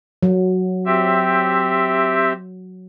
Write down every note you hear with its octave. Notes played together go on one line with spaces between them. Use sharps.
F#3
C4 G4 E5